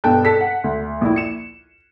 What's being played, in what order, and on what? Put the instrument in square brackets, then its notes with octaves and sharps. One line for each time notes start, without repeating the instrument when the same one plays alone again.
[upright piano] G2 B2 A4 G5 A5 F#6
A4 B6
F#5
D2
A#1 E4
C#7 E7